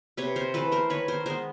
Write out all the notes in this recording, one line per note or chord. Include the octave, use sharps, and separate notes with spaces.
C3 B4 C#5
A#4 C5
E3 A3 A4 B4
A#4 C5
D#3 B4 C#5
A#4 C5
G#3 B3 A#4 C5